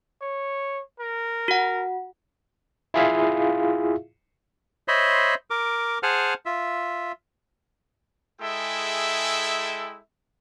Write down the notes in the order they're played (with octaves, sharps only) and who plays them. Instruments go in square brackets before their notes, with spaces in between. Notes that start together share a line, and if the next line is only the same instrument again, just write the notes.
[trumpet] C#5
A#4
[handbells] F#4 F#5
[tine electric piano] E4 F4 G#4 E5 F5
[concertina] C5 C#5 D#5 E5 B5 C6
A#4 D6
G#4 C5 F#5 G#5 A5 F6
F4 E5
[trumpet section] G#3 E4 G#4 A4 E5 G5